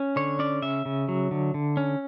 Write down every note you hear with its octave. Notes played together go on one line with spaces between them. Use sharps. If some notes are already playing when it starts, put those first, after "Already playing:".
Already playing: C#4
D3 C#5
C#4 D5
C#3 E5
C#3
F#3
D3
D3
C#4